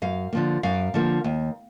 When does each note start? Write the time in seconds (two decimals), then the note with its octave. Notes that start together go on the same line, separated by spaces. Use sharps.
0.02 F#2 F5
0.33 D3 F3 A#3
0.63 F#2 F5
0.94 D3 F3 A#3
1.24 D#2